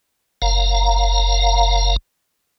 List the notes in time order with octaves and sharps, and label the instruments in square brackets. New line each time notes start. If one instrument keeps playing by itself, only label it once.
[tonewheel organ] F#1 F5 A#5